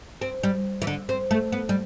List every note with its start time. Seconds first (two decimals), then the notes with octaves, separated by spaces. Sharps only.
0.21 C4
0.43 G3
0.82 E3
0.87 D3
1.09 C4
1.31 A3
1.52 B3
1.69 G3